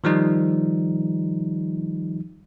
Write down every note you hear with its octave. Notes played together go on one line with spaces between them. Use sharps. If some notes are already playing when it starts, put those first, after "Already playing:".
D#3 F3 G3 D#4